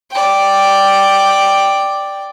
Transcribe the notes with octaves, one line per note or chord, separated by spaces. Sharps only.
D5 G5